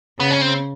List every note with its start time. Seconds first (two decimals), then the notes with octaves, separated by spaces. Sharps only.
0.19 C#3 B3
0.30 C#4
0.41 C4